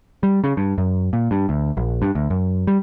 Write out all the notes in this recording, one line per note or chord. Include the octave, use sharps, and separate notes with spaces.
G3
C#3
G2
F#2
A#2
G2
D2
A#1
G2
D2
F#2
G3